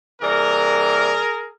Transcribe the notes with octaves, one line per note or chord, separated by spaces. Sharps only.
C3 E3 G3 A#3 G#4 A#4